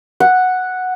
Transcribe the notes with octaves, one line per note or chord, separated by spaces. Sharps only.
F#5